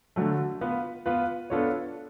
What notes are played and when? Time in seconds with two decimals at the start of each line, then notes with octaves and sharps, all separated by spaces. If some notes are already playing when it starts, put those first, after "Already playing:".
0.16 D3 F#3 A3
0.61 B3 F4 B4
1.06 B3 F4 B4
1.50 B3 D4 F4 A4 C#5